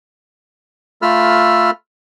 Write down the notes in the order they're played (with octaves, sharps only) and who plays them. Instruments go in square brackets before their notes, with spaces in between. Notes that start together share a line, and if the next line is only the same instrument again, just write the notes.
[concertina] A3 F4 A4 B5 E6 F6